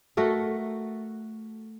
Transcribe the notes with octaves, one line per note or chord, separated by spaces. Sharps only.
A3 F#4 A4 A#4